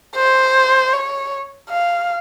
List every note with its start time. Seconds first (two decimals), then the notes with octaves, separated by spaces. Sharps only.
0.15 C5
0.93 C#5
1.69 F5